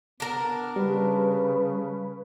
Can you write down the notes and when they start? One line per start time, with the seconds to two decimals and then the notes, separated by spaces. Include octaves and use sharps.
0.20 B3 D4 A#4
0.76 C#3 G3 B4